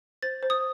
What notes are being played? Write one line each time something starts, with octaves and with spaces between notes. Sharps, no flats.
C5 A6
C5
D#6